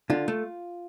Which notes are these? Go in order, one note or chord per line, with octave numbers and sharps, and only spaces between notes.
D3 F4
A3